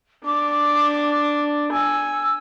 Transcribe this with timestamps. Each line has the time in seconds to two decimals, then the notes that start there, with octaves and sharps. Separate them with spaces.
0.25 D4 D6
1.72 G#5 E6